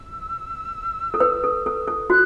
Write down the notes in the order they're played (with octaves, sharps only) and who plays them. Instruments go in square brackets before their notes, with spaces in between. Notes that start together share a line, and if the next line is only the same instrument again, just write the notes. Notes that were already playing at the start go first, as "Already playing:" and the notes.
Already playing: [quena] E6
[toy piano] A4
B4
A4
A4
A4
[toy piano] F#4 [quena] F#6